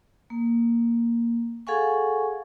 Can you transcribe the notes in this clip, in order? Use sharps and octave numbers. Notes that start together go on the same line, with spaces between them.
A#3
G#4 A4 F5 F#5 G#5 C#6